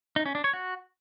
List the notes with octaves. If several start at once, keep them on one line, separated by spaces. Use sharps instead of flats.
D#4
C#4
D4
C#5
F#4